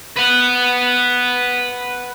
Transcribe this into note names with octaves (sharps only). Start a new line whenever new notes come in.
B4 F#5